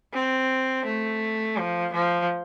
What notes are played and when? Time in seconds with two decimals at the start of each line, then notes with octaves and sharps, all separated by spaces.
0.14 C4
0.86 A3
1.57 F3
1.93 F3